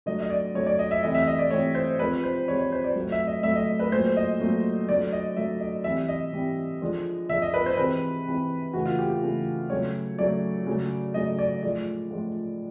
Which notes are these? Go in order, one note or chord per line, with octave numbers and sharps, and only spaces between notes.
D3 F#3 A3 D#5
D#5
D5
D3 F#3 A3 C#5
D5
D#5
E5
C3 E3 A3 D#5
E5
D#5
D5
C3 E3 A3 C#5
C5
C3 F3 G#3 B4
C5
C3 F3 G#3 C#5
C#5
C5
D5
A2 F#3 A3
E5
D#5
A2 F#3 A3 E5
D#5
B4
A#2 F#3 A3 C5
D#5
A#2 F#3 A3
D3 F#3 A3 D5
D#5
D3 F#3 A3 E5
D#5
C3 E3 G3 E5
D#5
C3 E3 G3
D3 F3 G#3
D3 F3 G#3 E5
D#5
B4
C5
C3 E3 G#3 B4
C3 E3 G#3
C#3 E3 A3 F#4
F4
G4
G4
C#3 E3 A3
C#3 F#3 A3 C#5
C#3 F#3 A3 D5
C#3 F#3 A3
C#3 F#3 A3 D#5
D5
A2 F3 G#3 D5
A2 F3 G#3